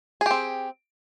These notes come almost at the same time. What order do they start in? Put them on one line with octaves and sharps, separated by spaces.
G#4 G4 C4